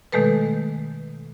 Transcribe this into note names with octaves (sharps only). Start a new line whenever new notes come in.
B2 D#3 G#3 A3 A4 B4